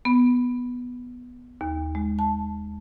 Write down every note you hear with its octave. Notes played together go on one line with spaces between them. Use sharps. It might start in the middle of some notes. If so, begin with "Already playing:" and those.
B3
D#2
G#3
A5